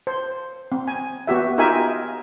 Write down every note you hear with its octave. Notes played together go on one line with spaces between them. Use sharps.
C5
C4
G#5
B3 F#4 G4 E5
D#4 F4 G4 A#4 E5 G#5